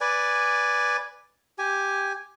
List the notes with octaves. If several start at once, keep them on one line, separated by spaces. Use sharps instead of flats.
B4 D5 G#5
G4 G#5